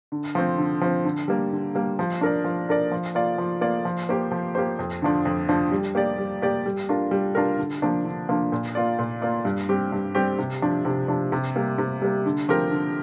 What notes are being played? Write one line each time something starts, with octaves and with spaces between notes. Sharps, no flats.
D3
F3 C4
D3
F3 C4
D3
G3 A#3
D3
G3 A#3
F3
D4 A#4 D5
F3
D4 A#4 D5
F3
A#3 F4 D5
F3
A#3 F4 D5
F3
A#3 G4 C5
F3
A#3 G4 C5
F2
D3 F3 D4
F2
D3 F3 D4
G3
A#3 G4 D5
G3
A#3 G4 D5
G3
D4 F4 A#4
G3
D4 F4 A#4
D3
F3 A#3 D4
D3
F3 A#3 D4
A#2
A#3 F4 D5
A#2
A#3 F4 D5
G2
G3 C4 G4
G2
G3 C4 G4
C3
F3 D4
C3
F3 D4
C3
G3 A#3
C3
G3 A#3
D3
F3 C4 G4 A#4
D3